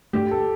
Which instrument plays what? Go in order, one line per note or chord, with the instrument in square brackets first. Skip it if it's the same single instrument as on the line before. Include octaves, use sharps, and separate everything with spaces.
[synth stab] G2 D3 A3 [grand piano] G4
[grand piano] A4